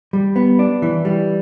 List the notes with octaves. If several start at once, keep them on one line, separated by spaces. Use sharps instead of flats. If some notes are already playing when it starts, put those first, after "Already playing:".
G3
B3
D4
E3
G3